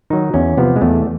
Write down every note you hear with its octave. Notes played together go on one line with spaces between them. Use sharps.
D#3 F#3 D#4
E2 C#4
C3 F3 B3
G#3
E2 A3